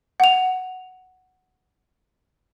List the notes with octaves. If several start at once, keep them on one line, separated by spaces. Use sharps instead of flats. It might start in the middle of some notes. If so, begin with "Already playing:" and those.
F#5 F7